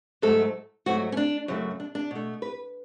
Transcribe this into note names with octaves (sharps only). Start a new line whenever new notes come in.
G#2 F#3 A3 A4
G#2 F#3 A3 F#4
C#4
D4
F#2 C#3 F#3 A3
D4
D4
B2 A3
B4